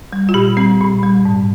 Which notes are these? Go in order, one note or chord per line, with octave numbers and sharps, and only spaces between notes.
G3
F4
A#2 G4
G3 C4
A#2
G3
G#2